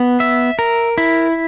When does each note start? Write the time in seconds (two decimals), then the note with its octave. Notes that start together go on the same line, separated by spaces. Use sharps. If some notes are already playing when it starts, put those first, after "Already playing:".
Already playing: B3
0.20 E5
0.59 A#4
0.98 E4